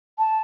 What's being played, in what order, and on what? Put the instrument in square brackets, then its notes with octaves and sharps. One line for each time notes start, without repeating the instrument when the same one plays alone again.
[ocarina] A5